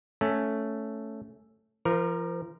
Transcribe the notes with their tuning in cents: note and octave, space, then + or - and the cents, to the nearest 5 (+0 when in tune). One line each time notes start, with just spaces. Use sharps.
A3 +0 C#4 +0
F3 -35 A#4 +0